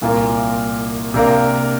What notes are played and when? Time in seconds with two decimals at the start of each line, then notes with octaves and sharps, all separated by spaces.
0.01 C2 A#2 A#3 F4 A#4
1.14 C3 A#3 D4 A#4 F5